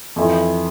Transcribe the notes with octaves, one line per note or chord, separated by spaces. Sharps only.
F2 E3